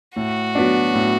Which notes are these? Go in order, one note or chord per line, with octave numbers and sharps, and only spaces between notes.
A2 F#4
F#3 B3 D4
A2